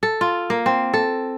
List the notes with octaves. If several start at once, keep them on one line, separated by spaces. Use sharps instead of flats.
A4
F4
A#3
C4
A4